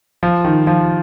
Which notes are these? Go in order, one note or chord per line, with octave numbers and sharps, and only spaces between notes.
F3
D#3
F3